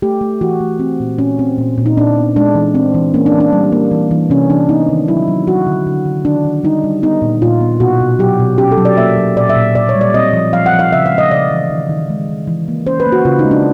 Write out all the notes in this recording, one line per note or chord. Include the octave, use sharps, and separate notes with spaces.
A3 G4
A3
E3 F#4
A3
C4
A#2
A#2 C#4
C4
A#2
A#2
D#4
A#2 D4
B3
G#3 D4
E3
C4
E3
A#3 C#4
D4
E3
D4
G3
A#3
E3
E3
C3 C#4
E3 D4
B3 D#4
D#3
F#3 E4
F#3
F#3 F#4
D3
D3
D3
D#3 D4
D#3
G3 D#4
G3
B3 D#4
A#2
A#2 F4
B3
B2 F#4
B2
F#3 G4
B2
C#4 G4
A4
F#3
D5
A#3 E5
F#3
A#2 D5
E5
A#2
A#2 D5
C#5
G3
D5
C4 D#5
F3
F3 F5
F#5
F3
F5
C#3 E5
F5
G#3
D#5
C#3 D5
E3
D#3
D#3
G#3
D#3
E3
A#3
C#4 C5
B4
A#3
F#4
C#3 F4
D#4
G#3
D4